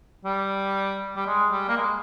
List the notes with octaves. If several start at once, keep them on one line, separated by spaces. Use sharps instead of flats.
G3
G3
G#3
G3
A#3
G#3